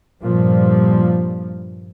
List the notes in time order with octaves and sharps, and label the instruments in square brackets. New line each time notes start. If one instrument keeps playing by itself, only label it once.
[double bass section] G2 A#2 F3 G3